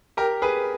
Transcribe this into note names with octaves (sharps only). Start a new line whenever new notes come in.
G4 A#4
G#4 B4